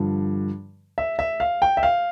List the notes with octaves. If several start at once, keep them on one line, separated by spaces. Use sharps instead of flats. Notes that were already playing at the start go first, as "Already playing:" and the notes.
Already playing: G2 D3 F3
E5
E5
F5
G5
E5
F5